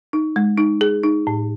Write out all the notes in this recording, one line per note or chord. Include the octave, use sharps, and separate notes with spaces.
D#4
G#3
D#4
G#4
D#4
A2